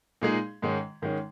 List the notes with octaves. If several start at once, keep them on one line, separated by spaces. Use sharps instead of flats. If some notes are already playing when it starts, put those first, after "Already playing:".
A#2 G#3 D#4 G#4
G#2 D#3 G#3 C#4
G#2 D#3 G#3 C#4